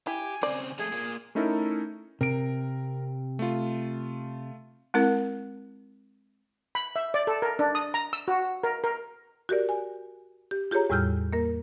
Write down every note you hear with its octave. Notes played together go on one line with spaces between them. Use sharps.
E4 G4 G#5
C#3 C4 D5
F2 A3 G#4
A#2 A#3
A3 C#4 D#4 E4 A4 A#4
C3 A#4 D7
A3 F4
G#3 C4 E4 A#4
B5
E5
D5
A4
A#4
D4
D#6
A#5
E6
F#4
A#4
A#4
F#4 G4 A#4 D5
G#5
G4
F4 G4 G#4 C#5 A#5
E2 A2 G3 E6 F6 G6
A#3 A#4